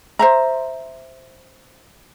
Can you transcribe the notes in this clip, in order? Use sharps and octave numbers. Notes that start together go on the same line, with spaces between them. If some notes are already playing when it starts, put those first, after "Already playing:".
C5 E5 A#5